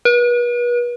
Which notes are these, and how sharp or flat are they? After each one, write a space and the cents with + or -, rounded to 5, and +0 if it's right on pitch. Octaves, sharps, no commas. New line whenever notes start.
B4 -40